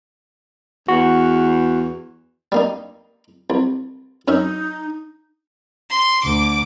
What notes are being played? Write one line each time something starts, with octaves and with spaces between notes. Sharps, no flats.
E2 F#4
G3 A#3 D#4
C2
F#2 C#4 D#4 E5
C6
D2 D6